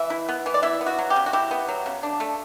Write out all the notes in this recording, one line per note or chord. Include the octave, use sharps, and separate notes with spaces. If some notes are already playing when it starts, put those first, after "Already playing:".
Already playing: E3 E5
E4
B3
E3
D5
E4 E5
B3
F#4
F#3
G4
C#3
F#4
E4 G4
B3
F#3
C#3
D4
A3